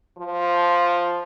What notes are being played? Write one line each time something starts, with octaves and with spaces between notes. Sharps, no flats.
F3